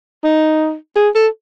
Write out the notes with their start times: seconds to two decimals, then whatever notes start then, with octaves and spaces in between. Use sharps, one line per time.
0.24 D#4
0.96 G#4
1.15 A4